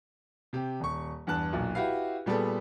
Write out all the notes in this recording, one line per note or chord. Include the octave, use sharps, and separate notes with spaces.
C3 G4
D#1 C#6
E2 G2 A5 F#6
B1 A#2 F#3
E4 F#4 G4 B4 F5
A#2 G3 B3 G#4 A4